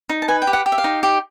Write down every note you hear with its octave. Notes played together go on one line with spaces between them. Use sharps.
D#4
A5
B4 G#5
G5
G4
F#5
G4
E5
F5
D#4
G4